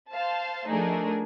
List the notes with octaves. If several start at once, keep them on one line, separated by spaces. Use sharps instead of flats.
C5 F5 A5
F3 A3 D4 D#4 G#4 A#4